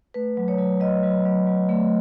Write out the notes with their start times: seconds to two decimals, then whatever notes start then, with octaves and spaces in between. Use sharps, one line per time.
0.14 A3 B4
0.37 F#3
0.48 C#5
0.58 F#3
0.80 F#3 D#5
1.03 F#3
1.25 F#3
1.47 F#3
1.69 A3